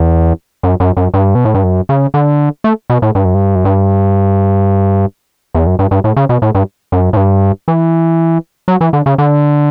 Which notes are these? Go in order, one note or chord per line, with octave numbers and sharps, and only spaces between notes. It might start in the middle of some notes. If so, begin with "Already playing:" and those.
Already playing: E2
F#2
F#2
F#2
G2
B2
A2
G2
F#2
C#3
D3
A3
B2
A2
G2
F#2
G2
F#2
G2
E2
F#2
G2
G2
A2
C#3
B2
A2
G2
F#2
A2
G2
E3
F#3
E3
D3
C#3
D3